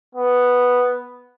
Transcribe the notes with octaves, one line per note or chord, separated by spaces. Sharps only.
B3